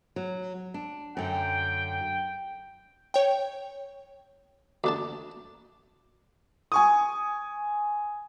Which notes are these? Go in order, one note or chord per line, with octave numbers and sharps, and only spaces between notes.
F#3
D4
F#2 D3 G5
C#5 G5
D2 D4 A5
G#5 C#6 D#6